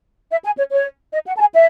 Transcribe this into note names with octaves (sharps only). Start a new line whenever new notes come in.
E5
G#5
C#5
C#5
D#5
F#5
A5
G#5
E5